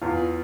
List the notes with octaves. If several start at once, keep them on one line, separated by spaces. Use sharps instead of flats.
E2 F4